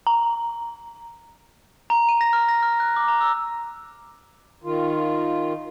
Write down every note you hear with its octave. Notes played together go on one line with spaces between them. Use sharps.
A#5
A#5
D#7
A#6
F6
A#6
F6
F#6
D6
A#5
E6
D#3 F4